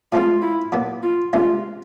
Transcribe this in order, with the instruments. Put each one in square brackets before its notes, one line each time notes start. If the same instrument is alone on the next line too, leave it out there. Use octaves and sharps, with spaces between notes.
[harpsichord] A2 F3 G#3 C4 [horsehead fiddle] F4
[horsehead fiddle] E4
[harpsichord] A#2 F#3 B3
[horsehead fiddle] F4
[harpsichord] D2 C3 E3 G#3 C#4 [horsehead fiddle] F4